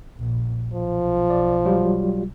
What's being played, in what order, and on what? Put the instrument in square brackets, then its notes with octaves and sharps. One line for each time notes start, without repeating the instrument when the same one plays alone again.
[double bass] A#1
[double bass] B1 [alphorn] F3
[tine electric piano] D5
F#3 G3 F4